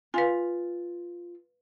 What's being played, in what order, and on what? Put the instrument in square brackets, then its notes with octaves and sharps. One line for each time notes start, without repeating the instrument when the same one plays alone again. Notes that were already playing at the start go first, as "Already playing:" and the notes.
[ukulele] F4 [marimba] B4 F5 G#5